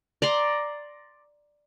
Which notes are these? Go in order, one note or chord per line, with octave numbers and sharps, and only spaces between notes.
D5 A#5 C6